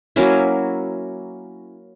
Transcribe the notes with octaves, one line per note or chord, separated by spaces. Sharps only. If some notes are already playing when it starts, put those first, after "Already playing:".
F#3 A#3 C#4 E4